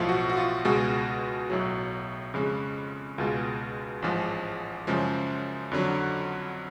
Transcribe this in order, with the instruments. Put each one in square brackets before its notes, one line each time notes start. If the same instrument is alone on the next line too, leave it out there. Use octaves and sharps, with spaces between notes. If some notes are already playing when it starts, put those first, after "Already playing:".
Already playing: [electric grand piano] B1 A2 F3 F4
F#4
F#4
F4
C#2 B2 G#3 F#4
B1 A2 F#3
F2 C#3 G#3
C#2 B2 G#3 F4
A1 G#2 F3 G#3
F#2 C#3 F3 G#3
F2 D3 F#3